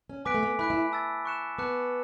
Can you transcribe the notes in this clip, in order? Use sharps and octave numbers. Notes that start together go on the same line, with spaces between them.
C#4
B3 G#5 D6 F#6 B6 D7
A3
B3
E4 B5 F#6 B6 D7
E4
A5 E6 A6
C#6 F#6 C#7 E7
B3 A5 D6 F#6 C#7